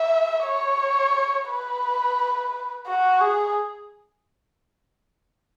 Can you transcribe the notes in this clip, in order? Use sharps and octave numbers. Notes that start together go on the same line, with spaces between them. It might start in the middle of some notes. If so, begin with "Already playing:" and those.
Already playing: E5
C#5
B4
F#4
G#4